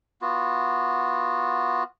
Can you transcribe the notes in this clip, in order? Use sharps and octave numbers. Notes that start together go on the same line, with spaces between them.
B3 F4 F#4